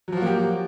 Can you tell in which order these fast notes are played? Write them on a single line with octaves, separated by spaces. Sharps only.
F#3 F3 F#4 A#3 G4